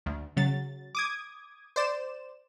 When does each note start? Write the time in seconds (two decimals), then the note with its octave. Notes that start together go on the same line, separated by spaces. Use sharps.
0.06 D2
0.37 C#3 F#3 A6
0.95 D6 D#6 G#6
1.76 C5 D5 E7